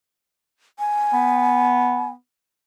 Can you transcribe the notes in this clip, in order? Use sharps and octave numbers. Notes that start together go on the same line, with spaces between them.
G#5
B3